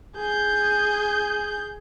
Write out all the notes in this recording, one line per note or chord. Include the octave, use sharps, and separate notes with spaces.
G#4 G6